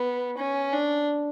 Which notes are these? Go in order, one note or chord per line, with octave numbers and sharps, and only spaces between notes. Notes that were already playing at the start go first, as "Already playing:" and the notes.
Already playing: B3
C#4
D4